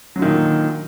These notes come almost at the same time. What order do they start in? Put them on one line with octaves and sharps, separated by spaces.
F#3 D3 D#3 A#2